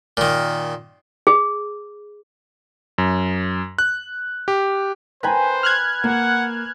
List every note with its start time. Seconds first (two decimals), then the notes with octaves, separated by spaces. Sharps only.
0.17 A#2 D#3
1.27 G#4
2.98 F#2
3.79 F#6
4.48 G4
5.23 B4 C5 G5 G#5 A#5 B5
5.63 F6 F#6 G#6
6.04 A#3 F#5